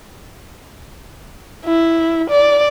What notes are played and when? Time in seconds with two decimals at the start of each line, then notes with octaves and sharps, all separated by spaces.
1.65 E4
2.30 D5